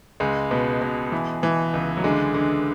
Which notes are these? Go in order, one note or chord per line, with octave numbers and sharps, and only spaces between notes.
C#2 G#3
B2
B2
E3
E3
C#2
F#3
D3 G#3
D3